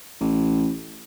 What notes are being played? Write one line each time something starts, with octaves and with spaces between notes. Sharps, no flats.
A1